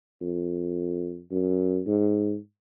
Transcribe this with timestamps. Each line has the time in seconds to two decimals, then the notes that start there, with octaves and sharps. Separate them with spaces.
0.21 F2
1.32 F#2
1.86 G#2